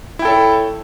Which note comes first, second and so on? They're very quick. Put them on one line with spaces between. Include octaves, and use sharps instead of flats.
E4 G5 A4 C#5